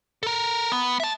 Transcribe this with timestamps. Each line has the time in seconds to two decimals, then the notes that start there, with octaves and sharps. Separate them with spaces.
0.23 A4 A#4
0.72 B3
1.00 E5 A5